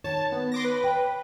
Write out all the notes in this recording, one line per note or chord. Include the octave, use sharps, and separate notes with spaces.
D#3 C#5 A5
B3
C6 D6 A#6
B4
G5